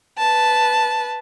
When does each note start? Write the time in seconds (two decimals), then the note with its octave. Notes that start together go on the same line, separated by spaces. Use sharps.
0.18 B4 A5